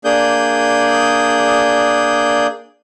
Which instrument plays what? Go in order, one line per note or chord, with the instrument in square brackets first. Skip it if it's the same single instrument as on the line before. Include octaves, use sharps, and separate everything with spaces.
[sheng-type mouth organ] A#3 D4 G#4 D5 D#6 G6